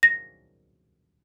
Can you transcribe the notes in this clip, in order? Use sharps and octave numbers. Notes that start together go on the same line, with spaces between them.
A#6